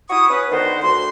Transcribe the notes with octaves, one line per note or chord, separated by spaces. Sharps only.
E4 F#4 C#6 D#6
C#4 B4
D3 D#3 B3 F#4 A#4 C5
D2 C6